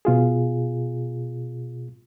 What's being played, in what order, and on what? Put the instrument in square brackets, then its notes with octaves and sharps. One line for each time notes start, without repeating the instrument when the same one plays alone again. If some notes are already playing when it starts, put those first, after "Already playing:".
[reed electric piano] B2 F4 G#4